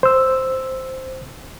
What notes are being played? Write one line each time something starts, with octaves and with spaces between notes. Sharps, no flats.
C5 E6